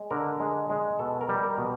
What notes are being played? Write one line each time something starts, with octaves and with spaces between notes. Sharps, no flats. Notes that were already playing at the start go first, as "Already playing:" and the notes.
Already playing: G#3
D3 A#4
G#3
G#3
B2 A4
A#4
G3
A#4
B2